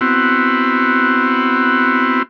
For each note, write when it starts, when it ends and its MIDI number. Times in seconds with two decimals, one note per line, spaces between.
0.01 2.22 59
0.01 2.22 60
0.01 2.22 64
0.01 2.22 66